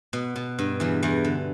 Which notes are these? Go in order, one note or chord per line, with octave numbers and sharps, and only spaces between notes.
B2
B2
G2
E2 E3
E2 E3
D3